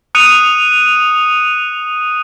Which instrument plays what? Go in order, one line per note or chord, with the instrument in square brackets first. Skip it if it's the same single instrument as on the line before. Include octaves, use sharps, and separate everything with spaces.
[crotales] D#6 F#6 C#7 D#7 F7